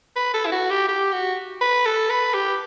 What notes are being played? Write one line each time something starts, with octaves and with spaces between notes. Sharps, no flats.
B4
A4
E4
F#4
G4
G4
F#4
B4
A4
B4
G4